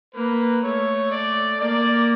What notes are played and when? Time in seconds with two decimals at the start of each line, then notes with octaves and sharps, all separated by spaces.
0.14 A#3 B4
0.63 A3 C#5
1.11 D5
1.60 A#3 D5